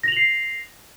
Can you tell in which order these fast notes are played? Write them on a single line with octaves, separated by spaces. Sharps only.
A#6 F7 F#7 C7